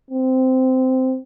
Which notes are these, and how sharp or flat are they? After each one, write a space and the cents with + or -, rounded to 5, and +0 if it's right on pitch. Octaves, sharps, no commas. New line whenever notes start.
C4 -15